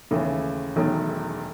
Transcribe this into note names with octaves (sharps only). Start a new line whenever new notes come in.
D#2 C#3 E3 A3
E1 E2 D#3 F#3 A3